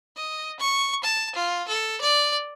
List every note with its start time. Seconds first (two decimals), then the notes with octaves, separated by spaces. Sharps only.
0.16 D#5
0.60 C#6
1.04 A5
1.35 F4
1.68 A4
2.01 D5